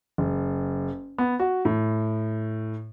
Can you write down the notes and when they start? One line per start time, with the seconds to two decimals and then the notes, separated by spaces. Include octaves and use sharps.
0.18 F#1
1.18 B3
1.40 F#4
1.65 A2